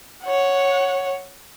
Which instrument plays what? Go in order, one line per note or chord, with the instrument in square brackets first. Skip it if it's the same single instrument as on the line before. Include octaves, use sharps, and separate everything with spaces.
[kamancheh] C#5 F#5